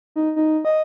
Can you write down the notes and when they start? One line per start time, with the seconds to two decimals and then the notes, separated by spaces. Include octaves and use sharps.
0.16 D#4
0.36 D#4
0.65 D#5